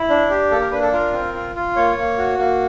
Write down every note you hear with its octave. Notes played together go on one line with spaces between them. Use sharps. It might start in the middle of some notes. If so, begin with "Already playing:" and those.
Already playing: E4
D4
G4
A#3 A4
A#4
D4 B4
A4
F4 A#4
C4
F4
F4
A#3 C#5
A#3
F#4
A#3